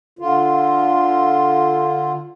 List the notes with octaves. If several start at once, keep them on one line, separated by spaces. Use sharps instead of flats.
D3 F4